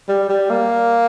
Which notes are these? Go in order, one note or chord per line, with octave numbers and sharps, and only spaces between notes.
G3
G3
A#3